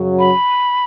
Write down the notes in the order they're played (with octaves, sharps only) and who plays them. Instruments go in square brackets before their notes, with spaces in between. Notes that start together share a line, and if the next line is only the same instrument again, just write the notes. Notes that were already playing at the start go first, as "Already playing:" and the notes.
Already playing: [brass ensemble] F#2 C#3 F#3
[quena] B5